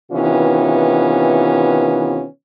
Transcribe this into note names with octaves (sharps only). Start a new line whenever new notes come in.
C3 D#3 E3 B3 C#4 F4